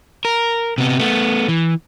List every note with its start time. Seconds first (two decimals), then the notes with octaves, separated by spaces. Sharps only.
0.25 A#4
0.78 C3 B3
0.99 A3 B3
1.48 E3